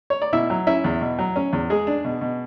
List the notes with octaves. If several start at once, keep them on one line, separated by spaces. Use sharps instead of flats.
C#5
D5
B2 E4 E5
F#3
C#4 E4 E5
E2
B2
F#3
C#4
E2
G#3 G#4
D4
B2
B2